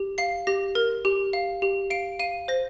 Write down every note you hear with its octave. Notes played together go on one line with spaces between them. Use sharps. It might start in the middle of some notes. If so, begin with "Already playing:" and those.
Already playing: G4
F5 C7
G4 A#6
A#4
G4
F5
G4
F5 D7
F5 D#7
C5 A#6